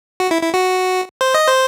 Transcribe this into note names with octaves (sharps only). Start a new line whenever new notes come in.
F#4
E4
E4
F#4
C5
D#5
C5